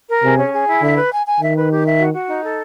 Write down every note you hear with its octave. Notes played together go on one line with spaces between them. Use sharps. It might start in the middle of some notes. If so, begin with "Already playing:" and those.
A#4
C3 G#4
C#4
G#4
E4
D3 E5
B4
G#5
G#5
D#3 E5
B4
G4
E5
F#4
F#4
D#4
A4